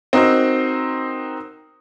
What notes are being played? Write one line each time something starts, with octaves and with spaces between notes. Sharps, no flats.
C4 D#4 F#4 A#4 C5